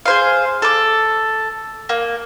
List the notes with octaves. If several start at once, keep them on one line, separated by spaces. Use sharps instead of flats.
G#4 C5 F5
A4 D6
A#3